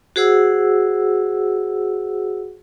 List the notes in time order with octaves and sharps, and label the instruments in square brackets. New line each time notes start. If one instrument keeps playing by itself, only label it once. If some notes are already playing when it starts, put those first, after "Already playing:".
[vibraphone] F#4 G#4 C5 F#5 E6